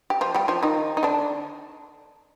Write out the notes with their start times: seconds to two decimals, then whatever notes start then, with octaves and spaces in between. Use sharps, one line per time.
0.10 G4
0.21 F3 F4
0.34 G3 G4
0.48 F3 F4
0.63 D#3 D#4
0.97 D#4
1.03 D3 D4